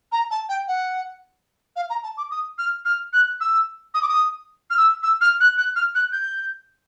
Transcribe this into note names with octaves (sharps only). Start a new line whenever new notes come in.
A#5
A5
G5
F#5
F5
A#5
A5
D6
D#6
F6
F6
F#6
E6
D#6
D6
D#6
F6
E6
E6
F6
F#6
F#6
F6
F#6
G6